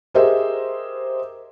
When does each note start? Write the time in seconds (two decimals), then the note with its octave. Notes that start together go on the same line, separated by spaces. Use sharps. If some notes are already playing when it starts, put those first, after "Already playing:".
0.14 G4 G#4 A#4 C5 D#5 E5